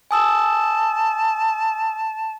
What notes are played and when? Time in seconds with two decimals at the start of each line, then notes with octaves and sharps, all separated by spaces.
0.11 G#5 A5 D#6 E6